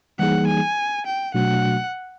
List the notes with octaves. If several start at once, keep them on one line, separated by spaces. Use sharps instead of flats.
E3 G3 A#3 D#4 G#4 F#5
G#5
G5
B2 F#3 A3 D4 F#4 F#5